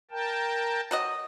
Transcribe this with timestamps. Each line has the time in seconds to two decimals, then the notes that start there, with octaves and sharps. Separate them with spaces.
0.11 A#4 G5 A5
0.91 F#3 F#4 D#5